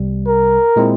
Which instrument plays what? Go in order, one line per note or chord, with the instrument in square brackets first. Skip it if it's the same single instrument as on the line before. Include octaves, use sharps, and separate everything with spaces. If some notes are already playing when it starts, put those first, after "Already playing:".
Already playing: [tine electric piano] C2 C3 G3
[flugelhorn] A#4
[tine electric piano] A#2 G#3 C4 E4